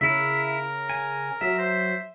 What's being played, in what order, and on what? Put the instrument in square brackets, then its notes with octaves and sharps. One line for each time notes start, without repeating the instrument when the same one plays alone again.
[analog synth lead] C#3 [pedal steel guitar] E4 E5 [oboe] A#4
[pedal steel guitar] G#5
[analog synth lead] F#3 [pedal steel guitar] E5
[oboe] C5